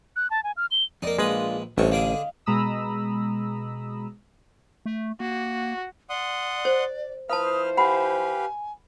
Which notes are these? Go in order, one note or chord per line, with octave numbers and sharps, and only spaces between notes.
F#6
A5
G#5
F6
G7
F2 A#3 D#4 D5
A#1 G#3 D4 F4 B4 D#6
A1 G2 C3 D4 A4 C#6
D3 D4 G#4 D#5 F5
B2 G#3 A#5 B5 D#6 E6
A3
A#3 F#4
D5 F#5 C6 D#6
C5
F3 E4 B4 C5 F5 A5 D#6 F6
G4 B4 F5 F#5 G#5 B5